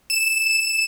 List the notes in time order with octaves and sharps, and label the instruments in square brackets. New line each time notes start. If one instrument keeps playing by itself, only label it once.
[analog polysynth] E7